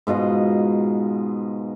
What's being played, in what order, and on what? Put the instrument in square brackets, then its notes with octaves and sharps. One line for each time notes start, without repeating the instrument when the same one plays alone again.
[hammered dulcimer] G#2 B2 F4 D#5